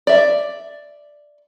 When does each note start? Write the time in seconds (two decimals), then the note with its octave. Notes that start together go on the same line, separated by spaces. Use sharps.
0.07 D5 E5